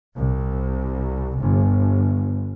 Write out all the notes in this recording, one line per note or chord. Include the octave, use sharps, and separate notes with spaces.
C2
G1